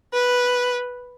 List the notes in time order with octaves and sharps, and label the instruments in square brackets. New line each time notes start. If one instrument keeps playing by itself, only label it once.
[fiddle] B4